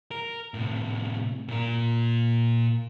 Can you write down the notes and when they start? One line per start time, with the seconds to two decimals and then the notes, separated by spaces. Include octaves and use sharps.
0.11 A#4
0.54 A2 C3
1.48 A#2 A#4